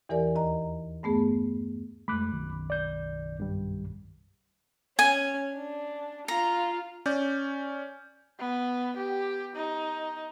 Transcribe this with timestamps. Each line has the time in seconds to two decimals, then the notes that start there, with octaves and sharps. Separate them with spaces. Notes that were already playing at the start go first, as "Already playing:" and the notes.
0.09 E2 E3 G4 A#4 D5 G#5
0.35 D#2 D#5 A#5
1.03 G2 A3 B3 G#4
2.08 F2 G#3 A3 B5 D6 F#6
2.31 F#1 B1 D#3
2.70 D5 G6
3.40 G2 G3
4.99 C#4 G#5
5.55 D4
6.28 F4 A#5
7.06 C#4 D5 G6
8.40 B3
8.97 G4
9.56 D#4